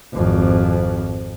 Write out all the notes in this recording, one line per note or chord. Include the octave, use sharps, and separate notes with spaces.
G#1 F2